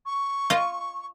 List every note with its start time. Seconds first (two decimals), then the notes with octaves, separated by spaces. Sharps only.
0.06 C#6
0.50 F4 D#5